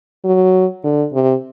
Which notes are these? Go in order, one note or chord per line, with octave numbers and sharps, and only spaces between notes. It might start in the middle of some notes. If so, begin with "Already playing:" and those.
F#3
D3
C3